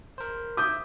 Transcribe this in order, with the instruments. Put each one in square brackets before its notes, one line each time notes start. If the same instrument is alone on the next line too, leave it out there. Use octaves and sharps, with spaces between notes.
[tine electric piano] A#4 C5
[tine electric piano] E5 [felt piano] D6 D#6 G6